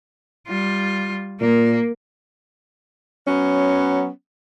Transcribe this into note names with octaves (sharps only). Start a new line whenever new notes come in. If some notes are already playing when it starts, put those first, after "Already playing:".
G3 F4
A#2 A#3
F#3 B3 C#4